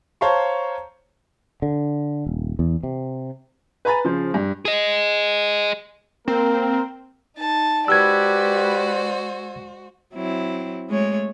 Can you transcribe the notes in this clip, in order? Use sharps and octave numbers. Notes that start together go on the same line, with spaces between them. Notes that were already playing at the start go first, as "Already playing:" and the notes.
C5 C#5 F5 A5 A#5 C#6
D3
D#1
E2
C3
B4 G#5 A#5 B5 A6
C#3 F3 C5
G2
G#4 D#5
A#3 C4 A#4
D#4 A5
G#3 F#4 G4 B4 C5 D5 E6 G#6
F#3 C4 E4
G#3 A3 C#5